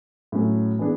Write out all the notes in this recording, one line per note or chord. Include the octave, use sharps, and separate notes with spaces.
A2 F#3 C#4
E3 B3 D4 G#4